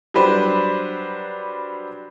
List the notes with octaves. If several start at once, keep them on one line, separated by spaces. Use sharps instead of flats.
F#3 G3 D4 G4 B4 C5